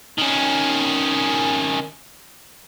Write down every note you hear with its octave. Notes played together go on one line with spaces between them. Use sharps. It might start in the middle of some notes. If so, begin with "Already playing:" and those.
D#3 C#4